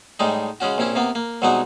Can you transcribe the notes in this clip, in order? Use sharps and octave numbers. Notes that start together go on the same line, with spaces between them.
A2 G3 G#3 D#4
C#3 G#3 C#4 F#4
A#1 C3 C#4 E4
C3 A#3 B3
A#3
C2 B2 F#3 G#3 D#4 F#5